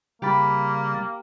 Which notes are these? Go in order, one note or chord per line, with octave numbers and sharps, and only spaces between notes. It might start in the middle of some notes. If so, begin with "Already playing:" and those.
C#3 G3 A#3 G4 B5 A6